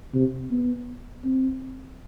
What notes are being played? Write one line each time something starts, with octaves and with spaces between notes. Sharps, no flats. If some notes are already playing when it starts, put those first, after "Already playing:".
C3
B3
C4